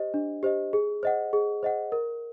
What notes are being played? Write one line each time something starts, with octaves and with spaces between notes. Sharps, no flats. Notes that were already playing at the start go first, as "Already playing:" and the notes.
Already playing: G4 C5 D#5
D4
G4 C5 D#5
G#4
C5 D#5 F#5
G#4
C5 D#5 F#5
A#4